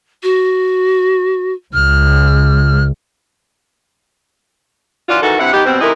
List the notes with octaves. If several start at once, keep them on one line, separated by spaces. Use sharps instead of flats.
F#4
C#2 F6
E3 F#3 D4 F4
G#2 D#3 E3 F#4 A4
G2 C3 E4 F#5
D#3 B3 D#4 G4
B2 G3 C4
C3 E3 A3 D#4 E4 A#4